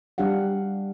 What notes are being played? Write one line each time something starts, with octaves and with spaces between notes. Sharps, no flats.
G3 D4 G4 F5 F#5